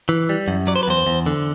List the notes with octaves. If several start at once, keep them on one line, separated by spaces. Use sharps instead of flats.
E3
G3
F#2
F#3 D5
C5
B4
E2 C5
E2
D3